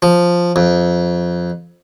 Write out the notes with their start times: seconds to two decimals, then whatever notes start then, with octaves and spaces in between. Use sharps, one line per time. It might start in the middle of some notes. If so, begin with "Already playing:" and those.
0.02 F3
0.56 F2